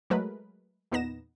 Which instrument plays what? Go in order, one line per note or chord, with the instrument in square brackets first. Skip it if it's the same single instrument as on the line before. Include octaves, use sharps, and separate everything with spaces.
[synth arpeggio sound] F#3 G#3 A3 A#4 B4
E2 A#2 B3 D#4 A#6 E7